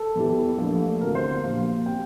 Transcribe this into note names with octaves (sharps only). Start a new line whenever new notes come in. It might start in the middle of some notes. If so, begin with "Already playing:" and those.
Already playing: A4
E2 E3 G3
A#1 A#2 A3
E1 D2 C3 E3 A#4
C5
A#1 A#2 G3 F5
C3 G5